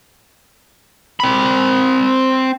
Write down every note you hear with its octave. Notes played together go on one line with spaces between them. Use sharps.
C4 B5